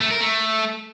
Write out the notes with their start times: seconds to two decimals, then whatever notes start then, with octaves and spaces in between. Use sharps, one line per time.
0.01 A3
0.11 A#4
0.21 A3